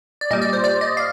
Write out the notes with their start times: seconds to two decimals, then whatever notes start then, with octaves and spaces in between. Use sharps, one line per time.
0.21 D5
0.31 A#2 G3 D#5
0.42 D5
0.53 C5
0.64 D5
0.81 D#5
0.97 F5